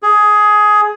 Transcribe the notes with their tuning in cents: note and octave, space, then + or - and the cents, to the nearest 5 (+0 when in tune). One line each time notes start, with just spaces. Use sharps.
G#4 +15